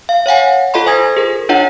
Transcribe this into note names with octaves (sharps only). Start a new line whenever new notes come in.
F5
C#5 F5 F#5 G#5
F4 A4 D#5 B5 C6
C5 G#5 D#6 G#6 A#6
G#4 A#4
D4 D#4 F4 C#5 D#5 F#5